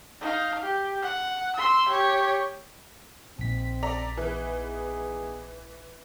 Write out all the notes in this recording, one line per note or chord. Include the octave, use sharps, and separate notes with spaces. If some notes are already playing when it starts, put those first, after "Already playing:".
D#4 F5
G4
F#5
C6 E6
G4 C#5
A#1 C4 D#4 B6
A4 D5 A#5
E3 B3 D#4 G#4